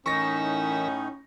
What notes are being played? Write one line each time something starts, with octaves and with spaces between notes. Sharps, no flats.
A2 E3 C#4 D#4 E4 A#4 C#6 A#6